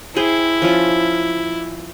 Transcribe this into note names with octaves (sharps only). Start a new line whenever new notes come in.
E4 G#4 C5 G5
F3 C#4 F4